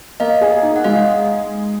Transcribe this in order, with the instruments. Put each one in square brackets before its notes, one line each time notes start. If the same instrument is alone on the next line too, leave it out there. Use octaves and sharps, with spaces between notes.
[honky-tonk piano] A#3 [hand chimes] D#5 F5
[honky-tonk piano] G#4
D#4
[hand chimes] F#5
[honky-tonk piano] G#3 [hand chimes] D#5 F5